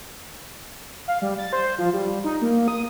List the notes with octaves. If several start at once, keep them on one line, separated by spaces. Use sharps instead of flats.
F5
G3
A6
C5
F3
G3
D#4
A#3
D#6